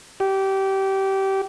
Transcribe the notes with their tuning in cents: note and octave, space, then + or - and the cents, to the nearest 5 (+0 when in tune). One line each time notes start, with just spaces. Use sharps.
G4 -20